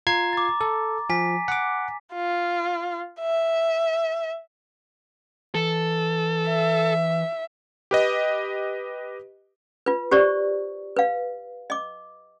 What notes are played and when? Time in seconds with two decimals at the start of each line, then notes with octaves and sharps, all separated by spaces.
0.07 F4 A#5 G#6 C7
0.33 D6 A6
0.61 A4
1.10 F3 G#5 B6
1.48 F#5 D6
2.14 F4
3.21 E5
5.55 E3 A4
6.49 E5
7.91 G4 B4 D#5
9.86 F4 B4
10.11 G4 C5 D5 C#6
10.97 B4 F5
11.70 D#5 D6